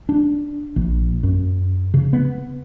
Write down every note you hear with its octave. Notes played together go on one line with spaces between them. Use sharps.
D4
A#1
F#2
C#3
B3